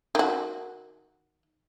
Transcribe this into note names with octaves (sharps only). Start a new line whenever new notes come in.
D#3 F#4